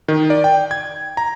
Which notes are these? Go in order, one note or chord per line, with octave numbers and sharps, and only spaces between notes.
D#3
D5
G5
G#6
A#5